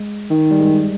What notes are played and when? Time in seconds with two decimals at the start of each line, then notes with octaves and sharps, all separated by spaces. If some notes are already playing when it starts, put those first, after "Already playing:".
Already playing: G#3
0.30 D#3
0.51 G3
0.60 G#3